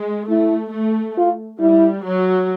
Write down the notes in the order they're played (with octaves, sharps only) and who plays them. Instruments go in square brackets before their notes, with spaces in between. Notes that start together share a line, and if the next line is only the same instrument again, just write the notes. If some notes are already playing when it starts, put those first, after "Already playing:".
Already playing: [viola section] G#3
[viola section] A3 [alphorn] E4
[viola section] A3
[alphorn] F4
[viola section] G3 [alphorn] E4
[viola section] F#3